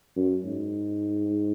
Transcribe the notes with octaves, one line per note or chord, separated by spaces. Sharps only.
F#2
G#2